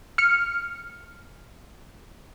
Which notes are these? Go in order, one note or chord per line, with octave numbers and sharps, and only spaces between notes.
F6 C#7